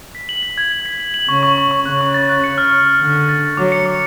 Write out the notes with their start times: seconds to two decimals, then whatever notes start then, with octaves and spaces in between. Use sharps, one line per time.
0.15 B6
0.29 F#7
0.43 B6
0.58 G#6
0.72 G#6
0.86 B6
1.00 F#7
1.14 F#7
1.29 C#3 C#6
1.43 C#6
1.58 C#6
1.71 C#6
1.86 C#3 F#6
2.01 C#6
2.14 A6
2.29 F#6
2.44 C#7
2.58 F6
2.72 F6
2.87 F6
3.00 D3 F6
3.15 F6
3.29 A6
3.43 A6
3.57 F#3 D6
3.72 C#7
3.86 D6